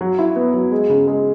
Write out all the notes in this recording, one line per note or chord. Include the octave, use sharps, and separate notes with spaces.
F#3
E4
B3
F#3
G#3
C#3
G#3